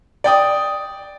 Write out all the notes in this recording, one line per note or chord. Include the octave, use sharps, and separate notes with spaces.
D5 G5 D#6